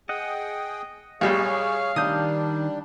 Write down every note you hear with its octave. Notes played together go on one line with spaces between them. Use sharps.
G#4 D#5 F#5 G5 D#6
A#1 G3 G#4 C#5 F5
D#3 G3 D4 D#6 G6